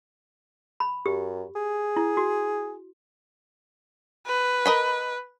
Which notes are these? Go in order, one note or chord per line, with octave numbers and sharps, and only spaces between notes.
B5
F#2 G4
G#4
E4
F#4
B4
A#4 D#5 B5